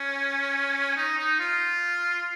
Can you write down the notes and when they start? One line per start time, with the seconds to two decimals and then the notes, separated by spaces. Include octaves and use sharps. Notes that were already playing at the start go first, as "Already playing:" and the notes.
Already playing: C#4
0.96 D#4
1.18 D#4
1.39 F4